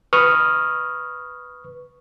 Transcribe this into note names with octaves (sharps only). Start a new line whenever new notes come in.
B4 C#6 D#6 F6